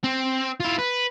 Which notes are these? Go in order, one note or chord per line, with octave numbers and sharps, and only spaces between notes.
C4
E4 F4
B4